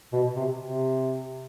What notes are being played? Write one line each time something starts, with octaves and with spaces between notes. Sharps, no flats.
B2
C3
C3